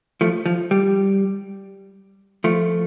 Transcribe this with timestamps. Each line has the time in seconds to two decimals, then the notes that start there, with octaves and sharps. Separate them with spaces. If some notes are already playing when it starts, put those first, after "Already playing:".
0.21 F3 A3
0.46 F3
0.71 G3
2.44 F3 A3